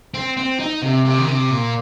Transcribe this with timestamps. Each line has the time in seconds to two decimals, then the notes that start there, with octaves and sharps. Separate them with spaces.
0.14 C4
0.37 C4
0.59 D#4
0.82 C3
1.05 C3
1.18 D#3
1.28 C3
1.50 A#2